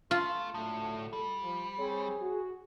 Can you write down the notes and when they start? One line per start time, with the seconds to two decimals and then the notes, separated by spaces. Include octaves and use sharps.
0.11 A3 F4
0.54 A2 D3 F#3 A3
1.13 G3 A4
1.42 F3
1.79 C2 C4 G#4 C#5
2.21 F#4